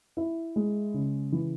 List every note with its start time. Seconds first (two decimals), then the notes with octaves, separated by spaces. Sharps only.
0.17 E4
0.56 G#3
0.94 C#3
1.32 E3